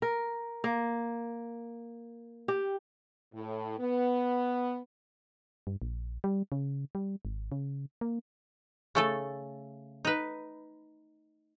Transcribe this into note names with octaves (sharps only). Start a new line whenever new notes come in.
A#4
A#3
G4
A2
B3
G2
A#1
G3
C#3
G3
G#1
C#3
A#3
C#3 A3 A4
D#4 B4